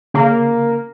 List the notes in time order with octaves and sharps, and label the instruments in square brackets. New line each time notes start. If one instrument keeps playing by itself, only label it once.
[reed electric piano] C#3 [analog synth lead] A#3